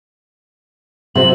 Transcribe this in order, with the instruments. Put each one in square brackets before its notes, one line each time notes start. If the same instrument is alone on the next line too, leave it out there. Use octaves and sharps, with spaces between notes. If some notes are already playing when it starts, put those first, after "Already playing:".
[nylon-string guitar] C3 E5 [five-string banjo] F#3 C4 F#4 [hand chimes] G#4 C5 [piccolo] F#7